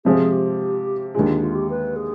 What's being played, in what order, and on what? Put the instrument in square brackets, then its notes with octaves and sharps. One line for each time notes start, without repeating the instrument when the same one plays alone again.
[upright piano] C3 F3 G#3 C4 [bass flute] G#4
[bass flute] G4
[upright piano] D#2 D3 G#3 [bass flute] F4
[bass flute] F4
F4
G4
B4
G#4